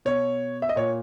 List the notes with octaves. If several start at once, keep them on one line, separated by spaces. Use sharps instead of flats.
B2 C#5
E5
D#5
A#2 C#5